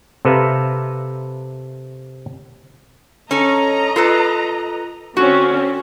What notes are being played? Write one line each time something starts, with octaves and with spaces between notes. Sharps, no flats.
C3 A4 B4 E5 F5 A#5
C#4 A4 D#5 A#5
F4 A4 B4
D3 C4 C#4 F#4